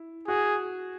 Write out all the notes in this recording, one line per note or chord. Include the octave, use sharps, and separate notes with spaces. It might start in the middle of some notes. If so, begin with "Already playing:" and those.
Already playing: E4
F#4 G#4